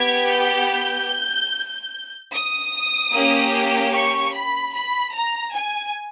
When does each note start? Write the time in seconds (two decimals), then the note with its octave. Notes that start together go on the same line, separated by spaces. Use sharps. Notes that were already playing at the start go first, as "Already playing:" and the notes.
Already playing: B3 G4 G#6
0.32 G6
2.33 D#6
3.13 A#3 C#4 G4
3.93 C#6
4.34 B5
4.74 B5
5.14 A#5
5.54 G#5